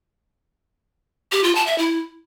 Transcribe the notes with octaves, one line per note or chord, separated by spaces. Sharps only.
G4
F4
A5
E5
E4